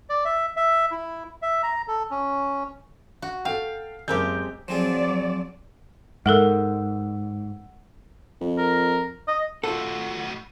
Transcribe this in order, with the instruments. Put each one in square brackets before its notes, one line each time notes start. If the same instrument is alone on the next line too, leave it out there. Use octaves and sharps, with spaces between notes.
[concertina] D5
E5
E5
E4
E5
A#5
A4
C#4
[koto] F#4
[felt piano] A4 G5 [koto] F5
[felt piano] F#1 A#4 G6 [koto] G#3 C4 G4
[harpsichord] F3 C4 G#4 [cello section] F#3 D5
[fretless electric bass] G#2 [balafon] G#3 A4 A#4 [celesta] F#5 E6
[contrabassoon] F2
[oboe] A#4
D#5
[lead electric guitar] A2 F#4 [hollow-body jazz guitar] F4 A4